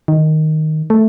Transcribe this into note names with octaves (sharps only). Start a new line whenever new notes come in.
D#3
A3